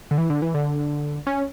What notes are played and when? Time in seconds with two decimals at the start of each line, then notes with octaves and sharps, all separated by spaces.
0.11 D3
0.18 E3
0.30 D3
0.42 E3
0.54 D3
1.27 C#4